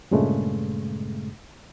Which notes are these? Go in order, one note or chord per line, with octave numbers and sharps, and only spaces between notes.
G2 A#2 C#3 G#3 A3